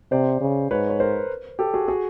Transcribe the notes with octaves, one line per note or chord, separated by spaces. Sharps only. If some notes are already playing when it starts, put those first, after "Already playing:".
C3 C5 D5
C#3
G#2 B4 C#5
C#5
A#4 C5
G4 A4
F#4 G#4
F#4 G#4